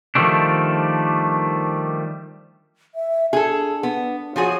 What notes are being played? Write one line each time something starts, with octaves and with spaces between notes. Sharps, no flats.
D#3 F3 G3 A3 D4
E5
D4 G#4 A4
B3
F3 F#4 G#4 C#5